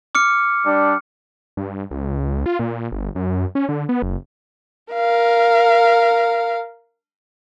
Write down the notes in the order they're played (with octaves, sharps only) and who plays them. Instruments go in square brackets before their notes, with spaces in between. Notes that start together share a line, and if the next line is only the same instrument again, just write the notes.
[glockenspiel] D6 F6 C#7
[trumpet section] G3 D4
[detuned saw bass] G2
C#2
F4
A#2
G1
F#2
C#4
D3
B3
F#1
[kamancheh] A#4 F5